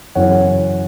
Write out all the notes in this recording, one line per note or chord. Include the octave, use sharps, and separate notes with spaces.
F#2 C#3 E3 C#4 C#5 F#5